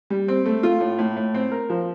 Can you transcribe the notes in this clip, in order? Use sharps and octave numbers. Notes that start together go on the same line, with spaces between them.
G3
C4
A3
F4
A2
A2
A2
C4
A#4
F3